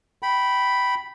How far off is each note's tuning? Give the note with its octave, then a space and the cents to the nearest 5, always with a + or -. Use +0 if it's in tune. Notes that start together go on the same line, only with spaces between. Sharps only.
G5 -20 B5 +0